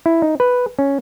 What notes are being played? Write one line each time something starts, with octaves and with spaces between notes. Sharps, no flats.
E4
D#4
B4
C#4